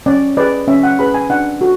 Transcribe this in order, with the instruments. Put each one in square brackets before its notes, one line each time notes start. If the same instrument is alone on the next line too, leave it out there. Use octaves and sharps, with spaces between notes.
[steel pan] C#4 D5
G#4 B4 D5
C#4 E5
F#5
G#4 B4 B5
G#5
D4 F#5
F#4 A4